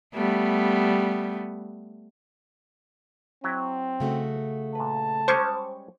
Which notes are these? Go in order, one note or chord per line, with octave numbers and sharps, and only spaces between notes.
G3 A3 B3
F#3 C4 E4 D#5
C#3 A3 F#4
A#2 B4 A5
G3 G#3 C#4 C5 C#6 D6